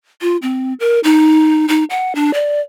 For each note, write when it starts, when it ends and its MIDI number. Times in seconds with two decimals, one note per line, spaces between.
0.22 0.37 65
0.42 0.74 60
0.80 1.00 70
1.04 1.66 63
1.69 1.84 63
1.90 2.13 78
2.15 2.33 62
2.34 2.60 74